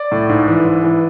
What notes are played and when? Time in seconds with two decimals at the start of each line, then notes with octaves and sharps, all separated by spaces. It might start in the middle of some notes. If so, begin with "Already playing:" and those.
Already playing: D5
0.12 A2
0.29 G#2
0.48 E3
0.65 G#2
0.84 E3